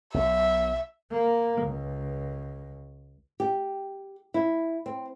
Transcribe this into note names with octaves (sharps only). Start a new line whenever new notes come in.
B1 F#3 E5
A#3
C#2
G4
E4
C4